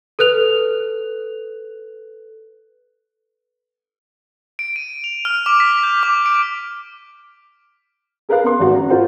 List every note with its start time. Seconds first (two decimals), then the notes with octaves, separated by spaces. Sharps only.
0.19 A4 B4 F#6 F7
4.59 D7
4.76 D#7
5.04 F7
5.25 F6
5.46 D6
5.60 B6
5.83 G6
6.03 D6
6.26 D7
8.29 G#4 A#4 B4 F5 F#6
8.44 B3 C6
8.59 G#1 F#4
8.73 C#4 A#5
8.90 F4 F#4 A#4 C5 F#5